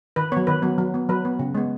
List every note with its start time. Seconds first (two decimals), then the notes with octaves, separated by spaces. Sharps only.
0.16 D#3 B4
0.32 F#3 B3 C#5
0.47 D#3 B4
0.62 F#3 B3
0.78 F#3
0.94 B3
1.09 F#3 B4
1.25 B3
1.39 C#3
1.55 G#3 B3